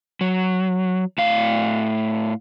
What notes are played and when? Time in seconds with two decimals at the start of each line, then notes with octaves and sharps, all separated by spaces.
0.21 F#3
1.18 A2 F5